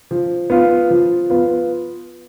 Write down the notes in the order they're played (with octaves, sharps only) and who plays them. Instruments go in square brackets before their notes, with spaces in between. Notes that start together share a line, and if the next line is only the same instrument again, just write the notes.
[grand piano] F3
B3 F4
F3
B3 F4